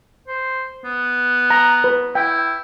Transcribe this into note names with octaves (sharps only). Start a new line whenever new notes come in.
C5
B3
A#5
B4
E4 G5